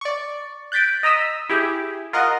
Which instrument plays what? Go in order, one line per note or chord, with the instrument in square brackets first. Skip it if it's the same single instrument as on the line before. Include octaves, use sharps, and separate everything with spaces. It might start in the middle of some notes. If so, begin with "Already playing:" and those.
[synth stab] D5 C#6
F#6 G6 A6 B6 D7
D#5 A#5 D#6 E6 B6
E4 G4 G#4
F4 A#4 D#5 F#5